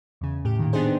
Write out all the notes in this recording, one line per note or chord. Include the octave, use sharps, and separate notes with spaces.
E2 C#3
A2 G4
A#2 D#3
B3 D4 D#4 G4 G#4 C5